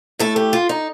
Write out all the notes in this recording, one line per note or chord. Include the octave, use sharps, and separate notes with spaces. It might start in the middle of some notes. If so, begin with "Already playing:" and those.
A2 A3 A4
G4
F4
D#4